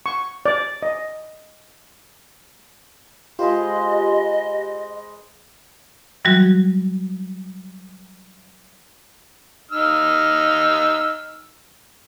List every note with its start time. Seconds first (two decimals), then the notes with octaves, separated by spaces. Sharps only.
0.06 C#6
0.46 D5
0.83 D#5
3.39 G#3 F4 G4 B4 C5 D#5
6.25 E3 F#3 G3 F#4
9.71 D#4 E6 F6